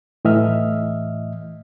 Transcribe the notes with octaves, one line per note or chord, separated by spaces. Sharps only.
A2 E3 D#5 E5 F6